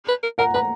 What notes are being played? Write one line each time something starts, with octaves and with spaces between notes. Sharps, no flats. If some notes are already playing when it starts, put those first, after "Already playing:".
B4
A#4
A#4 F#5 A#5
B4 A#5